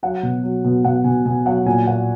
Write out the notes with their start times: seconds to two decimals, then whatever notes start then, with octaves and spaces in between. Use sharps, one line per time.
0.03 F#3 F#5
0.23 B2
0.43 F#3
0.64 B2
0.84 B2 F#5
1.04 B2 G#5
1.25 B2 G#5
1.46 F#3 F#5
1.66 A#2 G#5
1.87 A#2 F#5